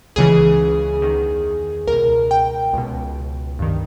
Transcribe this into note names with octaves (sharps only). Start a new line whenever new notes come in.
C#2 C#3 E3 G#4
E2 D#3
C#2 B2 A#4
G5
C#2 B2
G2 D#3